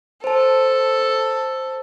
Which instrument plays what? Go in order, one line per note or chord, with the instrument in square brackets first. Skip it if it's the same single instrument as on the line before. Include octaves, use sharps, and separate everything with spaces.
[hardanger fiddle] A4 [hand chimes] C5 A5